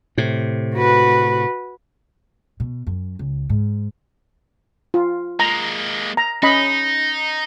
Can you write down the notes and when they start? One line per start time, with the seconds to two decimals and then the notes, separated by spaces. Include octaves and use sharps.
0.18 A2 C3
0.75 F#4 B4
2.60 B2
2.87 F#2
3.19 C#2
3.50 G#2
4.94 F4
5.40 G#3 A#3 A#5
6.17 A#5
6.43 C#4 D#4 D#5 B5